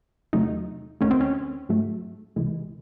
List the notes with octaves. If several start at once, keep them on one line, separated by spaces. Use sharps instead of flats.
E2 C3 F#3 A3 D#4
D#2 D#3 A3 C#4
C4
C#4
G#2 F#3 A3
C#2 C3 E3 G#3